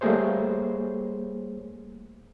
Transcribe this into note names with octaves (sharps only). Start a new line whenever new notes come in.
G3 A3 A#3 G#4 C5 C#5